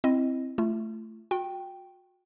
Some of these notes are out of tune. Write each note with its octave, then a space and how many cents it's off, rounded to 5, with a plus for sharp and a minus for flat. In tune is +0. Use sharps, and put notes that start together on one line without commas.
C4 +0 E4 +0 D#5 +0
A3 +0 F4 -40
F#4 -40 G5 -5